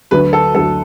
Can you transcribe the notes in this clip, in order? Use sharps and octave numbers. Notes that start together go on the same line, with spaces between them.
D2 D3 F#3 B4
A4
D2 D3 F#3 A4